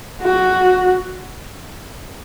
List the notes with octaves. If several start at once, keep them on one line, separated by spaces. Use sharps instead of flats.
F#4